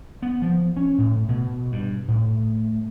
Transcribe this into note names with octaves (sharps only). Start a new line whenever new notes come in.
B3
F3
C#4
A2
B2
G2
A2